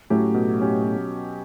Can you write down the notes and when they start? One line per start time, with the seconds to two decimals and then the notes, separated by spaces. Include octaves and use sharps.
0.10 A2 F#3 C#4 G4
0.34 B2
0.60 F#3 C#4 G4
0.84 B2